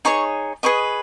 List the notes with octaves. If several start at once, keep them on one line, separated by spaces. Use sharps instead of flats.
D#4 G#4 C#5 C#6
G#4 B4 D#5 C#6